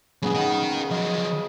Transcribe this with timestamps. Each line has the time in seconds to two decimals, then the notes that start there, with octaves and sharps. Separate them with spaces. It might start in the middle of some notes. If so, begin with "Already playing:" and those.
0.22 F#2 A#2 C#3 B3 G#4
0.35 D#4 A#4
0.91 F3 F#3 D#5